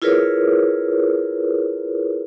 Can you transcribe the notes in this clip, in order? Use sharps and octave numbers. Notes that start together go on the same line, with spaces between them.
E4 F4 G#4 A#4 B4 C#5